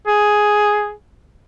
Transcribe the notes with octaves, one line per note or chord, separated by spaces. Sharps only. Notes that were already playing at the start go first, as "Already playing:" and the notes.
G#4